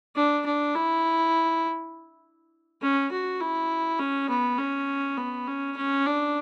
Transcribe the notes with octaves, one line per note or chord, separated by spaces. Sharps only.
D4
D4
E4
C#4
F#4
E4
C#4
B3
C#4
B3
C#4
C#4
D4